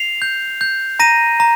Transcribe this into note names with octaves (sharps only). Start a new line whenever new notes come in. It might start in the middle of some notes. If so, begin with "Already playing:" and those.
Already playing: C7 F7
G6
G6
A#5 A#6 D#7
A#5